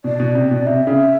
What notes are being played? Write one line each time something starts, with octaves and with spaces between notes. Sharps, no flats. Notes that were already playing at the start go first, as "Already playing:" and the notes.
B2 D5
B2
C3
B2
C3 E5
C#3